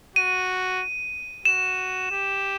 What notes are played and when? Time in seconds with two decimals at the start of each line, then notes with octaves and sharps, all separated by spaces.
0.16 F#4 D#7
1.45 F#4 E7
2.11 G4